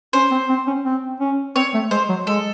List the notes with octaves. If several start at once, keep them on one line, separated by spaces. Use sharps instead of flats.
C#4 C5
C4
C4
C#4
C4
C#4
C4 C#5
A3
G#3 C5
F#3
G#3 A4